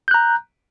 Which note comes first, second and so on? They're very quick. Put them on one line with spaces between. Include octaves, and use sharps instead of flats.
G6 F#6 A#5